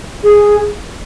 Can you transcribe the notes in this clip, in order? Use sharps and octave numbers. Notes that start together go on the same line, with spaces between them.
G#4